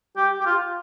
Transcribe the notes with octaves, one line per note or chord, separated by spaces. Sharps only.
G4
G4
F4